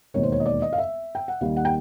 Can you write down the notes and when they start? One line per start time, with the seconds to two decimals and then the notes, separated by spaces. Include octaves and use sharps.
0.14 E1 D#2 D#3 C#5
0.23 C5
0.32 C#5
0.40 D#5
0.46 D5
0.62 D#5
0.73 F5
0.78 E5
1.15 G5
1.28 F#5
1.41 D#2 D#3 G3 F5
1.57 F#5
1.65 G5